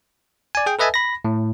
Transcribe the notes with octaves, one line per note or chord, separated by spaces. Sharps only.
D5 G#5
G#4 G5
A4 B4 D#5 E5 G#5 A5
B5 A#6
A2